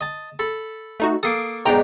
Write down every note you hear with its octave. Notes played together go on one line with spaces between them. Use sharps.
D#5 A5
A4 B5
A3 D#4 F#4
A#3 A4 D#6 C7 D7
B1 G#2 D4 G5 A#5